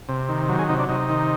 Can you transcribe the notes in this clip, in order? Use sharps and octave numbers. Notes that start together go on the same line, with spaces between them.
C3
D#3
F#3
G#4
C3 D#4
D4
C3 D#4
D#3